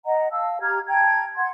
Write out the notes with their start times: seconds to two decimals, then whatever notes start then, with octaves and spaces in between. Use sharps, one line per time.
0.05 D#5 F#5 A#5
0.32 F5 A5 E6
0.61 G4 A#5 F6 G#6
0.87 G5 A5 A#5 G#6
1.36 F#5 C6 G#6